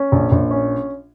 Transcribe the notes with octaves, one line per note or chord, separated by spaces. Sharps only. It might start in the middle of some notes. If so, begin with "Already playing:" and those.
Already playing: C#4
A#1
A#1
C#4